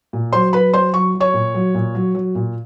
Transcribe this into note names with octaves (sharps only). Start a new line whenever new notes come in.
A#2
F#3 C5 C6
F#3 B4 B5
F#3 C5 C6
F#3 C#6
F#3
C#5 C#6
A#2
F#3
A#2
F#3
F#3
A#2